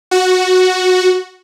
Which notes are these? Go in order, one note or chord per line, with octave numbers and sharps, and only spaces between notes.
F#4